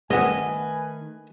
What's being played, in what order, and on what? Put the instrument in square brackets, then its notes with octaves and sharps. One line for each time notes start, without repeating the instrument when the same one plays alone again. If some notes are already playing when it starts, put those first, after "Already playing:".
[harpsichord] G2 B3 C4 [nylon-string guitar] D#3 A3 [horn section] B4 G#5 [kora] D#5